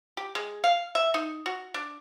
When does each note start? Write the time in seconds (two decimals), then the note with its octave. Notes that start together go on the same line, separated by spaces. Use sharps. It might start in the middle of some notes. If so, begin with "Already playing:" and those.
0.17 G4
0.35 G#3
0.64 F5
0.95 E5
1.14 D#4
1.46 F#4
1.74 D4